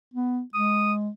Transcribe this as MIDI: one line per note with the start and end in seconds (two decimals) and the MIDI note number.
0.14 0.42 59
0.54 1.10 56
0.54 0.93 87